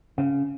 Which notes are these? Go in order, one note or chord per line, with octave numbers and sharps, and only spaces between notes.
C#3